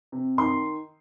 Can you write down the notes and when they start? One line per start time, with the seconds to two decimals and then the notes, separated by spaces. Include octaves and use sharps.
0.12 C3
0.38 D#3 C6